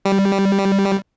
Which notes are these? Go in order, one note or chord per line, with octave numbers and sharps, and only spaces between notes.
G3